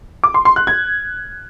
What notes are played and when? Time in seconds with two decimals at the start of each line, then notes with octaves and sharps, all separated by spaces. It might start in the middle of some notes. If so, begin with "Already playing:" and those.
0.24 D6
0.34 C6
0.45 C6
0.56 F#6
0.67 G#6